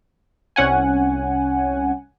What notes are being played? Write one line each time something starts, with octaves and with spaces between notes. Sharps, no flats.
C2 C#4 F#5 G#5